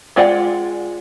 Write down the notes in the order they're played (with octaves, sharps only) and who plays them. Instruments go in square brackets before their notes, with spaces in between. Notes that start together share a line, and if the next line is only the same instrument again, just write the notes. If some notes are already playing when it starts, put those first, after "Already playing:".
[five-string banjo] G#3 F4 D5 F#5 G5